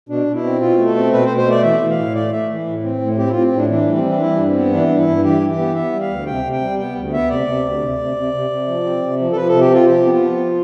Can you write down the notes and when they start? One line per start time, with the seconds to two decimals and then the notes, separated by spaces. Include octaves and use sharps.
0.09 B2 D4
0.27 B2
0.34 E4
0.44 C4
0.60 B2 F4
0.78 A3
0.86 A4
0.95 C4
1.12 B2 B4
1.26 C5
1.29 B2
1.37 C5
1.46 A3 D5
1.63 E3 E5
1.80 E3
1.90 F5
1.97 A2
2.15 A3 D5
2.32 A3 E5
2.50 E3
2.67 A2
2.84 C4
3.01 A2
3.18 C4 G4
3.27 E4
3.31 C4 F4
3.52 A2 D4
3.69 E3 D4
3.87 G3
3.95 C4
4.04 E3
4.12 D4
4.21 G3 E4
4.36 G2 D4
4.47 C4
4.55 B3
4.72 E3 D4
4.88 G2 D4
4.98 E4
5.07 G2
5.24 E3 G4
5.41 E3
5.50 G4
5.59 B3
5.75 B3 E5
5.93 G3
6.01 F5
6.10 D2
6.26 C3 G5
6.45 C3
6.52 G5
6.61 G3
6.79 B3 G5
6.95 D2
7.13 B3 E5
7.30 C3 D5
7.47 C3
7.64 D2
7.81 C3
7.99 C3
8.16 C3
8.34 C3
8.50 C3
8.67 F3
8.84 C4
9.02 C3
9.19 F3
9.32 A4
9.36 F3 B4
9.49 C3 A4
9.61 G4
9.71 C4 F4
9.87 F3 G4
10.05 B3
10.14 F4
10.22 F3